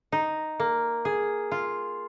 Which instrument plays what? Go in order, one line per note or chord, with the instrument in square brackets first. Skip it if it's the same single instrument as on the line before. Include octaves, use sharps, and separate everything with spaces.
[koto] D#4
A#3
G#4
F4